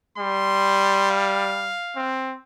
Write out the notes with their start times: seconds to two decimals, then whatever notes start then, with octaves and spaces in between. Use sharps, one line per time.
0.18 G3 C6
1.10 F5
1.96 C4